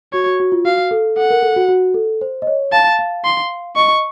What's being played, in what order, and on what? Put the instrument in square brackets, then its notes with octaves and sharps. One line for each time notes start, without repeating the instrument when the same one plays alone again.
[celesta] F#4 [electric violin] C#5
[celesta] F#4
F#4
F4
[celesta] F#4 [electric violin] F5
[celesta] A4
[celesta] A4 [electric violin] F#5
[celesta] A#4
A4
F#4
F#4
A4
C5
D#5
C#5
[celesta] F5 [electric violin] A5
[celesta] F5
[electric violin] C6
[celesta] D#5 [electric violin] C#6